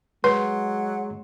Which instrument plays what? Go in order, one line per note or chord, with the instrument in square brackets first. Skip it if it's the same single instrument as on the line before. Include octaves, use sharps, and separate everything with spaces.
[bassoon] F#3 [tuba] G#3 [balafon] B4 [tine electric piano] C6